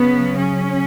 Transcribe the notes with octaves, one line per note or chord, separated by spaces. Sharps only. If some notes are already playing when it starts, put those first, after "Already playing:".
Already playing: C#3 F#3 B3
C#4